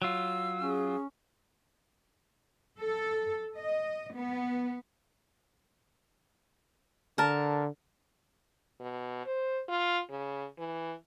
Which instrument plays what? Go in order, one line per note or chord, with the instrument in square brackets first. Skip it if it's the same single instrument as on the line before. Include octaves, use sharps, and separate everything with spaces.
[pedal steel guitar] F#3 F4 [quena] E6
[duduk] C#4 [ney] G#4
[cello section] A4
D#5
B3
[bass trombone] D3 [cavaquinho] A#4 A5
[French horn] B2
C5
F4
C#3
E3